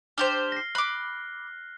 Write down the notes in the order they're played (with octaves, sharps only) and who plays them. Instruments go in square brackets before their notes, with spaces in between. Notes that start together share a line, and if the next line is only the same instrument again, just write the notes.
[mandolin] D4 G4 C5 [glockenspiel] F6 G7
[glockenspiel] A#6 C7
[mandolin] B5 D6 [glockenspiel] F#6